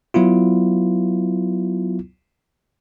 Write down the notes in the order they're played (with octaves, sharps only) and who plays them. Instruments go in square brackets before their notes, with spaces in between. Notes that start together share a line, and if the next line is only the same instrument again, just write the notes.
[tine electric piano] F#3 B3 E4 F4